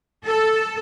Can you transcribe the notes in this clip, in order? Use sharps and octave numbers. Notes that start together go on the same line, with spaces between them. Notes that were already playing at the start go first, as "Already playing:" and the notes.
A4